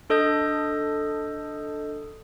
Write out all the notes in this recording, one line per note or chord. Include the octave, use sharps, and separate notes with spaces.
D4 A4 D#5 D#6 G6